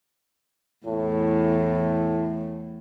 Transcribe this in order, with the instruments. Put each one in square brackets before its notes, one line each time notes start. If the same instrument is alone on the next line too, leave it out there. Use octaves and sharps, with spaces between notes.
[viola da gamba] E2 A3 [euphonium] A2